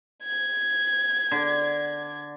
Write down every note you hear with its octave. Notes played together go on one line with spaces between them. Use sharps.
G#6
D3